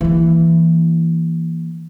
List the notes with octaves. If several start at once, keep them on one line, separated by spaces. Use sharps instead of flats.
E3 A#3